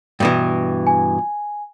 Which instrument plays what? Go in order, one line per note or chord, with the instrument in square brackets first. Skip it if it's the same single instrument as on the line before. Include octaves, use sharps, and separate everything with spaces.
[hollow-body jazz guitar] G2 B2 E3
[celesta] G#5